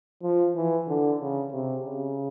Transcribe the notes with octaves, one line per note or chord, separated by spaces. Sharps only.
F3
E3
D3
C#3
C3
C#3